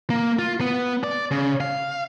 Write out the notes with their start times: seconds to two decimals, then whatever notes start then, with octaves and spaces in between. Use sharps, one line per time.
0.10 A#3
0.39 F4
0.60 B3
1.04 D5
1.31 C#3
1.61 F5